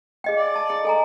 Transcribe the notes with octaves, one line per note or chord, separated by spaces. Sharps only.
G#4 D#5 F5 G5 G#5
D5
A5
D#4 G#4
A4 G#5 A#5